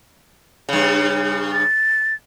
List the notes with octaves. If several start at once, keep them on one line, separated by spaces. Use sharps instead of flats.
G2 C#3
A6